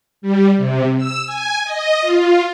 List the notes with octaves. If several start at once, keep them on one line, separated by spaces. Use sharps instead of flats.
G3
C3
E6
G#5
D#5
F4